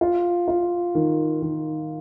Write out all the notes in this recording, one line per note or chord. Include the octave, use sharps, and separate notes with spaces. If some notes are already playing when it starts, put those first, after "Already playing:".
F4
F4
D#3
D#3